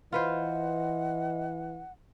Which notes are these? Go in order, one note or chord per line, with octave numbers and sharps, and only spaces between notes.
E3 F4 B4 C5 D#5 F#5